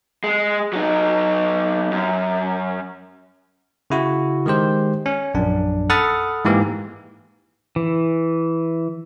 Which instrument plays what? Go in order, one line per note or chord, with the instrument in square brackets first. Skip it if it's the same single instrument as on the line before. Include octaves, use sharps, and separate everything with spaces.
[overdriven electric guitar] G#3
F#3 D#4
F#2
[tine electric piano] C#3 E4 F#4
D#3 G#3 G4 C5
C#4
A#1 F#2 D4
A4 F#5 B5 D#6 F6 A6
G#2 E3 A#3 G4 A#4
[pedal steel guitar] E3